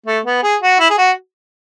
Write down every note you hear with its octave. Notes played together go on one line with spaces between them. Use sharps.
A3
B3
G#4
F#4
E4
G#4
F#4